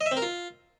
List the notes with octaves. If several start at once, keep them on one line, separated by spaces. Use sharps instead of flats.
D#5
E5
C4
A#4
F4